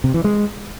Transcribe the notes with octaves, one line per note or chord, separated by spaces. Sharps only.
C3
E3
G#3